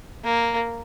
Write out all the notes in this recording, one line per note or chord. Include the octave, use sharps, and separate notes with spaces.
A#3